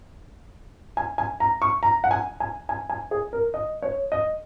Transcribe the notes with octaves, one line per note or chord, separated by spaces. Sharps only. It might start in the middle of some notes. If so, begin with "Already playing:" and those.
G#5
G#5
A#5
C#6
A#5
F#5
G#5
G#5
G#5
G#5
G#4
A#4
D#5
C#5
D#5